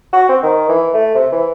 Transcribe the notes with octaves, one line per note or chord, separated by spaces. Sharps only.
F#4
C4
D#3
E3
A3
C3
E3